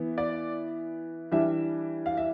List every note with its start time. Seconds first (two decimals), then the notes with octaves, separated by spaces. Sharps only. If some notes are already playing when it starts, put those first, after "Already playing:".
Already playing: E3 B3
0.18 D5
1.32 E3 G3 D4 E5
2.06 F5
2.17 E5